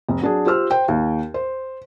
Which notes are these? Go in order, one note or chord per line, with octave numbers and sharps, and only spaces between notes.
F1
F#3 D4 G#4
F4 G4 C5 E6 F6
C5 G5
D#2
C5